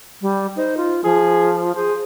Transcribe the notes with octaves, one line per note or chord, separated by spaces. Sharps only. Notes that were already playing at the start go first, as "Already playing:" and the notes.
G3
D#4 C5
F4
F3 G#4
G#4 C5